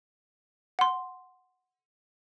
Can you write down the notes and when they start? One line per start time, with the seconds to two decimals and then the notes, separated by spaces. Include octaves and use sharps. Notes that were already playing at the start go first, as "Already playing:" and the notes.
0.79 F#5 C6